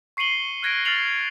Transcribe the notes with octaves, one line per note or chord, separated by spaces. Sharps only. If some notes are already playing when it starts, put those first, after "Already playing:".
C#6 C7 C#7 D#7 F#7 G7
F6 F#6 G#6 A#6 C7 D7
F6 A6 A#6 C7 F7 F#7